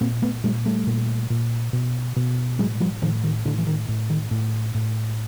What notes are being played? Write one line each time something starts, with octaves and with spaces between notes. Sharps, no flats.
A#2 A#3 C4
A3 B3
A#2 G3 A3
G3 A3
A#2
A#2
B2
B2
A2 F#3 G#3
F3 G3
A2 D#3 F3
D#3
A2 D3
E3
D#3
A2
D#3
A2
A2